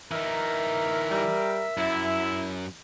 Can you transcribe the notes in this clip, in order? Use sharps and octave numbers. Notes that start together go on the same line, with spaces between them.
E3 D#4 A#4 E5
G3
F#2 E4